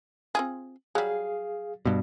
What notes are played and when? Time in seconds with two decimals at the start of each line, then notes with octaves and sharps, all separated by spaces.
0.35 C4 F4 G#4
0.95 F#3 G3 G#4 F5
1.86 G2 B2